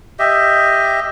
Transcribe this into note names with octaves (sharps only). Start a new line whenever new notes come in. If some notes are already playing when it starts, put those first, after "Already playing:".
G4 D#5 E5